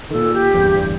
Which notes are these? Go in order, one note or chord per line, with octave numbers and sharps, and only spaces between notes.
A#2 D#3 A4
G4
D1 E2 G2